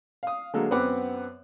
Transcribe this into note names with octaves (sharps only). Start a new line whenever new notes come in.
F5 D#6
D3 F#3 G#3 A#3 A4
F#2 B3 C4 B4 F#5 D6